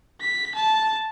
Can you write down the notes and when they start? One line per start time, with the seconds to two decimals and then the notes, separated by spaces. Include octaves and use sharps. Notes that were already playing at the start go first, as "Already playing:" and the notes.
0.21 B6
0.55 A5